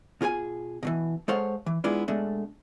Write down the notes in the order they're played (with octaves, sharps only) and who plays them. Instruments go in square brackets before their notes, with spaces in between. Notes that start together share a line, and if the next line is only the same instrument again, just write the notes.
[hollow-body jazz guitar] B2 F4 G#4 A#4 G#5
B2 D#3 E3
G#3 A4 C5 C#5 F5 F#5
E3
G#3 B3 D4 E4 F4
B2 G#3 A3 D4